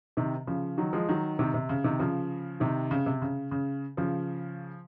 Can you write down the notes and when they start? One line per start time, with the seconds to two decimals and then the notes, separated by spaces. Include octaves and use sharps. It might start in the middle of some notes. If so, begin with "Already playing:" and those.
0.17 C3 D#3
0.47 C#3 F3
0.78 D#3 F#3
0.93 F3 G#3
1.08 D#3 F#3
1.39 C3 D#3
1.54 C3
1.69 C#3
1.84 C3 D#3
1.99 C#3 F3
2.60 C3 D#3
2.91 C#3
3.06 C3
3.22 C#3
3.51 C#3
3.97 C#3 F3